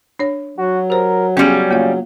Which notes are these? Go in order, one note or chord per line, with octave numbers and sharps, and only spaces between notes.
D4 C#5
F#3 F#4
G4 A#4 C5
C#3 G3 B3 C#4 G#4
C#3 A#3 F4 F5